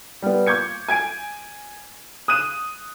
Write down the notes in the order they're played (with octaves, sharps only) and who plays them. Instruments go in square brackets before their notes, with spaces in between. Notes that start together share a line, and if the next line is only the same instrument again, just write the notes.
[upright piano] G3 B3
C#6 D6 G6 G#6 C#7
G#5 G#6 D7
D#6 F#6 D#7 E7